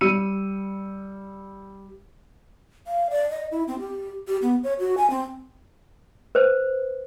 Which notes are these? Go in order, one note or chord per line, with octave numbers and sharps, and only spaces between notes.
G3 E6 C#7 D#7
F5
D5
D#5
E4
C4
G4
G4
B3
C#5
F#4
G#5
C4
B4 C5